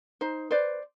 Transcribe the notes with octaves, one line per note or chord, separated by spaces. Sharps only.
D#4 C5
B4 C5 D5